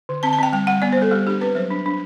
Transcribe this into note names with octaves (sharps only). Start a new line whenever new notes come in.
D3
C4 A5
A5
C4 G5
G3 G5
G3 F#5
B3 D5
C5
G3 A4
G3 G4
D4 G4
C4 B4
F#3 C5
D4
D4